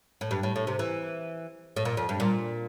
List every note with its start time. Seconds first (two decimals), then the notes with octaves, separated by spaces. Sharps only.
0.21 A2
0.31 G2
0.43 A2
0.56 A2
0.67 C3
0.79 E3
1.76 A2
1.85 A#2
1.97 F2
2.09 G2
2.20 A#2